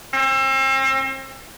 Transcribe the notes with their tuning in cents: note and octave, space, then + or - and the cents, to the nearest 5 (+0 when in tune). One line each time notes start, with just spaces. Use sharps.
C4 +40